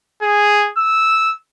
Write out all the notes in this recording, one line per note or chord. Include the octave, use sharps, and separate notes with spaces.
G#4
E6